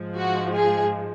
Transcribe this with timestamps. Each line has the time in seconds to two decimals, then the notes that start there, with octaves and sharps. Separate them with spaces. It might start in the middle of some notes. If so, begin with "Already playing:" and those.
Already playing: G#2 F3 G#3
0.18 F#4
0.56 G#4